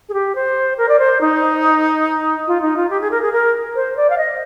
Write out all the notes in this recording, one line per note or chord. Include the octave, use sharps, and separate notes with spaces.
G#4
G4
C5
A#4
D5
C5
D#4
F4
D#4
F4
G4
G#4
A#4
G#4
A#4
C5
D5
F5
D#5